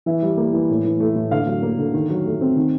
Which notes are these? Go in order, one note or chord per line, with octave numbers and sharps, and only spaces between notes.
E3 E5
G3
A#3
E3
A2
E3
A3
A2
D3 F5
F#3
A#3
D3
D#3
F#3
A3
C4
D#3